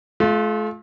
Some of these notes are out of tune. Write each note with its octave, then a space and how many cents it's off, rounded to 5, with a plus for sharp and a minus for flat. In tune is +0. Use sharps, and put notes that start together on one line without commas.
A3 -40 F4 +0